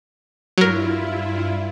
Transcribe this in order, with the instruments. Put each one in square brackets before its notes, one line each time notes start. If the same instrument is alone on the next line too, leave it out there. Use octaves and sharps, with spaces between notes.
[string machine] G2 E4 F4 [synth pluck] F#3 A#4